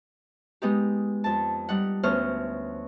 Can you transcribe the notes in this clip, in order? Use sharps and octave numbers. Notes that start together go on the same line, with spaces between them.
G#3 B3 D#4 G4
F2 A5
G3 D#4 F#5
D2 B3 C#4 C5 F6